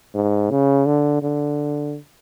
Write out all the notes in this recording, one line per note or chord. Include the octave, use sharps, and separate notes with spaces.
G#2
C#3
D3
D3